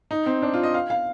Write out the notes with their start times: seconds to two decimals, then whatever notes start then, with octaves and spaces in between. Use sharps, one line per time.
0.11 D#4
0.26 C4
0.42 D4
0.54 F4
0.63 D#5
0.74 F5
0.90 F5